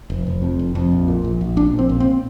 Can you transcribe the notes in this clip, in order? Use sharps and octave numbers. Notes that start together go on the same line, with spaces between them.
F1
F1
F2
F1
F2
A#1
A#2
A#1
A#1
A#2 D4
A#1
C4
A#2
C4